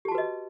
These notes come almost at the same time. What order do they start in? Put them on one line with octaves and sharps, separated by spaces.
G4 A5 F#4 B4 D#5